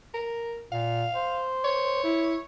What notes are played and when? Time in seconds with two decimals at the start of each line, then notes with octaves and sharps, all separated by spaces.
0.14 A#4
0.72 A#2 F5
1.15 C5
1.64 C#5
2.04 E4